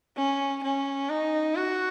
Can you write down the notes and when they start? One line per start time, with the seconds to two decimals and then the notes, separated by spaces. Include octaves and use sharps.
0.16 C#4
0.63 C#4
1.09 D#4
1.55 F#4